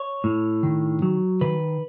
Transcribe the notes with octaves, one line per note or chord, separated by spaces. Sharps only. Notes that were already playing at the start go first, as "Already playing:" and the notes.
Already playing: C#5
A2
D#3
F#3
D#3 B4